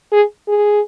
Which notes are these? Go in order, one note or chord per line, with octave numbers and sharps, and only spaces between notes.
G#4
G#4